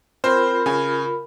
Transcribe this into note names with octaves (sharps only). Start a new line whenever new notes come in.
C4 F4 A#4 C5 B5
C#3 G#5